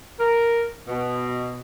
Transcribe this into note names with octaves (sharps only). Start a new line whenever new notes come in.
A#4
B2